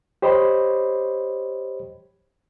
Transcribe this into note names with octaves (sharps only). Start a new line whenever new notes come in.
G4 C5 C#5 D#5 B5